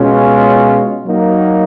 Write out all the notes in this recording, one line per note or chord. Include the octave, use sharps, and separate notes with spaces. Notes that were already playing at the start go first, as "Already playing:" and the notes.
Already playing: B2 G#3 C#4 F4
F#3 A#3 D#4 F#4